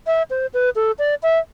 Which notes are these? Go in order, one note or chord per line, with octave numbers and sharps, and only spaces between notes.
E5
C5
B4
A4
D5
E5